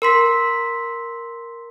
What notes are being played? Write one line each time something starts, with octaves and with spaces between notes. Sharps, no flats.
A#4 C6 B6